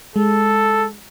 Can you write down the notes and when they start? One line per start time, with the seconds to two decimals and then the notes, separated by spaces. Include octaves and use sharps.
0.16 G#3 A4